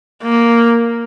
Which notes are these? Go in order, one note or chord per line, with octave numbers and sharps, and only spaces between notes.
A#3